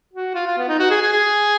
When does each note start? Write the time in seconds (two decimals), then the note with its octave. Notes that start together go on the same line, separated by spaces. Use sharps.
0.13 F#4
0.35 F4
0.47 F4
0.58 B3
0.69 D#4
0.80 F#4
0.91 G#4
1.02 G#4
1.13 G#4